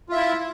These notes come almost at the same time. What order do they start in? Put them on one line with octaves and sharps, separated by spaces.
F4 E5 E4